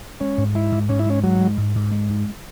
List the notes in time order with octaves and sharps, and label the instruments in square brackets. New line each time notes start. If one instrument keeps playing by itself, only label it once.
[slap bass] G#3 [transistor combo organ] C#4
[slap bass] G#2
[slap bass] G#3 [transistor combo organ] E4
[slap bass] G#2
[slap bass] G#2 [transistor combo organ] C#4
[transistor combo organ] E4
[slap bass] G#3 [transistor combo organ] C#4
[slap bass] G#2 [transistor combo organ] F#3
[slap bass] G#3
G#2
G#2
G#3
G#2